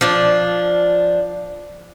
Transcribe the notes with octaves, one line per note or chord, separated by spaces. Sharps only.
F3 D4